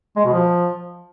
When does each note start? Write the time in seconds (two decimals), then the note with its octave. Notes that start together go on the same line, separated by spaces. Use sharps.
0.17 G#3
0.25 B2
0.33 F3